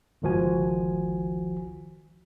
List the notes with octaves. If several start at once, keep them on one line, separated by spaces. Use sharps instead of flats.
G1 C#2 D#3 F3 F#4 G#5